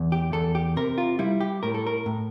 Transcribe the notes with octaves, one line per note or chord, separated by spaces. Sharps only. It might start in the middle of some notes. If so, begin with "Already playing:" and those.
Already playing: E2
G4
E2 A4
G4
C3 A#4
F4
G3 E4
G4
A2 A#4
A4
A#4
A2